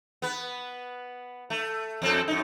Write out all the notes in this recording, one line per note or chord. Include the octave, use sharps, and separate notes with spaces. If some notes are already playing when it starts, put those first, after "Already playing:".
B3 B4
A3
F2 C4 A4
F#2 D#4